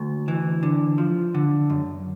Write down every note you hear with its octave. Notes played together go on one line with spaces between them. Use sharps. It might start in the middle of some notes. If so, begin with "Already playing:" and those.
Already playing: D2
E3
D3
F3
D3
F#2